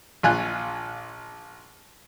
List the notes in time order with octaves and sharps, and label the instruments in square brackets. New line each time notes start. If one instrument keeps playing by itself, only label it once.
[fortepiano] A#1 F4 G#5 F#6